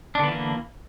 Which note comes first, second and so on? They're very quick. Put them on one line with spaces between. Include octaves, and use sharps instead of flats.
D4 D3 B3 E3 A#3